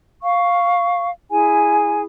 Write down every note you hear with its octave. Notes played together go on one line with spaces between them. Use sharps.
F5 C#6
E4 G#4 G#5